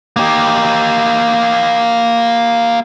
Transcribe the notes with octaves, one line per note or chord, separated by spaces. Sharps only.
A#3 G4